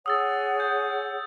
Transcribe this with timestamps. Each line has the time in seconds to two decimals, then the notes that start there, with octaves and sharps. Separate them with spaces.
0.06 G#4 C#5 F#5 D#6 E6 A6
0.60 G6